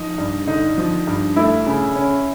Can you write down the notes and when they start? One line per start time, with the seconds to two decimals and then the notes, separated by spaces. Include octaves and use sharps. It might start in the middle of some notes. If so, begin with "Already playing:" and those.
Already playing: F3 D#4
0.18 G2
0.47 D3 D#4
0.78 F3
1.07 G2
1.36 A3 E4
1.66 C#3
1.96 C#4